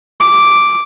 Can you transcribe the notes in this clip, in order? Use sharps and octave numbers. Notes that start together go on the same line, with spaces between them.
D6